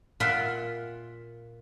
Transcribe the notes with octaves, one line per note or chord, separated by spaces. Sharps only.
A#2 F4 E5 F#5 C6